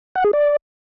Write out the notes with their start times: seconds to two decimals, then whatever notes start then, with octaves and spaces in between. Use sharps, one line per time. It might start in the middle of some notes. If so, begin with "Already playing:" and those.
0.15 F#5
0.24 G#4
0.33 D5